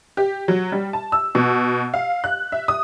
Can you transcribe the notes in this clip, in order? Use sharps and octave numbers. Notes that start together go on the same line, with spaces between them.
G4
F#3
G3
A5
E6
B2
F5
F#6
E5
D#6